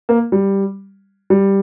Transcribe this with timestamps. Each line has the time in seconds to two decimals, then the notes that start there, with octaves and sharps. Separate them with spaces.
0.09 A#3
0.32 G3
1.30 G3